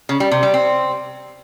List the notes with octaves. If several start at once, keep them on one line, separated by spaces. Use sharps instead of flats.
C#3
G3
C3
G3
C4